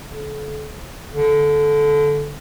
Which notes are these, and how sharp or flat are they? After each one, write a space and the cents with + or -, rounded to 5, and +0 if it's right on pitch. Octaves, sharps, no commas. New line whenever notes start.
D3 -40
D3 -15